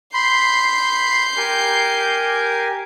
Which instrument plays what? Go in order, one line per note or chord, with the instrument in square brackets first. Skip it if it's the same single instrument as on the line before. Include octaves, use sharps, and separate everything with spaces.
[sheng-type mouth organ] B5 C6 [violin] G6 C7
[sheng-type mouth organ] G4 A#4 G#5